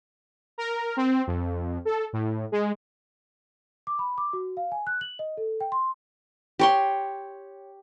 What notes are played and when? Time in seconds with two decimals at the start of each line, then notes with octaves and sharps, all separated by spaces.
0.58 A#4
0.97 C4
1.27 F2
1.85 A4
2.13 A2
2.52 G#3
3.87 D6
3.99 B5
4.18 D6
4.33 F#4
4.57 F5
4.72 G#5
4.87 F#6
5.01 F#7
5.19 D#5
5.37 A4
5.61 G5
5.72 C6
6.59 G4 C#5 C6